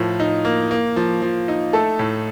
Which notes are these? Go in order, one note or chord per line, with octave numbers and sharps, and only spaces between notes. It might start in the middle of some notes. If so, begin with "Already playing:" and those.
Already playing: A2 F3 A#4
D#4
A#3
A#3
F3
F3
D#4
A3 A4
A2